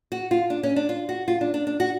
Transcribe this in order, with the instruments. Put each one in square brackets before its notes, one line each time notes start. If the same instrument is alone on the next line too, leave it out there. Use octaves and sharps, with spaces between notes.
[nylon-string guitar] F#4
F4
D4
C#4
D4
F4
F#4
F4
D4
D4
D4
F#4